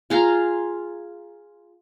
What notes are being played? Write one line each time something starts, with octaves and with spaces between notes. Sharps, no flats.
F4 G#4 A#5